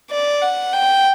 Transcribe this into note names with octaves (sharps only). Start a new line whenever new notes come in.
D5
F#5
G5